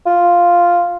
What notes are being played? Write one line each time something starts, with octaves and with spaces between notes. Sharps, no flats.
F4